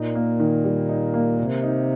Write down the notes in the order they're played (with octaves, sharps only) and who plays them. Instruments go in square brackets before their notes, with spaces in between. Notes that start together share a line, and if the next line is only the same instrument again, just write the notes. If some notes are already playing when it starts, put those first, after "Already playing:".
Already playing: [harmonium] A#2 [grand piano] D#4
[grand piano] A#3
D#3
G3
D#4
A#3
[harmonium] C3 [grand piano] A#4
[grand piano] D#4